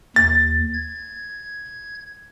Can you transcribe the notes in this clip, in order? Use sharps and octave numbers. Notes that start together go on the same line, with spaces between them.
D#2 A6
G#6